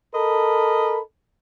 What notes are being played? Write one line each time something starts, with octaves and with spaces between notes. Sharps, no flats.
A4 A#4 D#5 B5